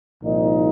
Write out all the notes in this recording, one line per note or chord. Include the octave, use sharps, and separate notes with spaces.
C2 A#2 F3 D#4